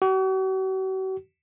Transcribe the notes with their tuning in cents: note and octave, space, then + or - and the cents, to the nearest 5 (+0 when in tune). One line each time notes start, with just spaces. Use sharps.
F#4 +45